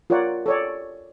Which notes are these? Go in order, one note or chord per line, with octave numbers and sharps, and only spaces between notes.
F4 A#4 C#5 D5 F#5
A4 C#5 D5